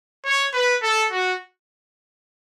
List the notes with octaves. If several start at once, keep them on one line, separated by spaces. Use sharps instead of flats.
C#5
B4
A4
F#4